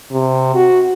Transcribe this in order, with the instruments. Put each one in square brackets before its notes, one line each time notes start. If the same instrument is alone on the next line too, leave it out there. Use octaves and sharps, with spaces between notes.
[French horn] C3
F#4